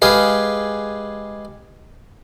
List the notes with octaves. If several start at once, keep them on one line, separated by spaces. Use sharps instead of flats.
G#3 G4 G#4 B4 F5